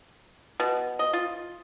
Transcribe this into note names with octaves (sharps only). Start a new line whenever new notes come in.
B2
D#5
F4